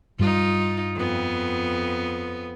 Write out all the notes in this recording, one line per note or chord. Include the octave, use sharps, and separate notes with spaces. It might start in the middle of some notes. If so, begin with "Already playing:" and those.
G2 G3 D#4 F4
F2 B3